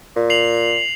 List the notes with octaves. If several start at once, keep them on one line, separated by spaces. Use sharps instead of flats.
A#2
C7 F7 F#7